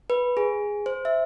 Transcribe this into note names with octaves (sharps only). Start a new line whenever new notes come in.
B4
G#4
C5
E5